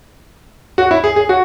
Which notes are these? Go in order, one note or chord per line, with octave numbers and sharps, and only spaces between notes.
F#4
E4
G#4
G#4
F#4